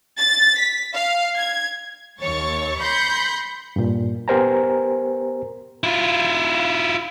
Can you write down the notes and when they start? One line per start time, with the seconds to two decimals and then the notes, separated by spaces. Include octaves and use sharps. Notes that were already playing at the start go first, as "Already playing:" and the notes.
0.18 A6
0.60 B6
0.95 F5
1.37 G#6
2.20 D#2 C#5 C#6 A6
2.80 B5 C6 G6 A#6 C7 C#7
3.76 G2 A#2
4.28 B3 G4 A#4 C5 G#5 A#5
5.84 E4 F4